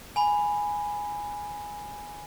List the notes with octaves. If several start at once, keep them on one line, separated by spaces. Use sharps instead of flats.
G#5 B5